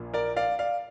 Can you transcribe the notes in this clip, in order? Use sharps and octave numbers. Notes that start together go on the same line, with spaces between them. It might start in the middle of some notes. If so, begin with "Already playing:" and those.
Already playing: A#1 A#2 F3 A#3
A#4 D5
D5 F5
D5 F5